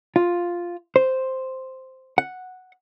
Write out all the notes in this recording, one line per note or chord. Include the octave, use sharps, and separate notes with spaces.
F4
C5
F#5